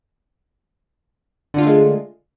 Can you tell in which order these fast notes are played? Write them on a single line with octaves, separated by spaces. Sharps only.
D3 F4 A3 G#3